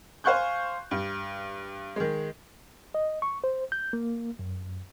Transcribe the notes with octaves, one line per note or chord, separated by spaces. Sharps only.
C5 F5 G#5 C#6 F#6 G6
G2
D#3 G#3
D#5
C#6
C5
G6
A#3
F#2